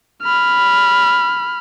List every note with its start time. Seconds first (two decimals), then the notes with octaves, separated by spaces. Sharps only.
0.23 B5 F6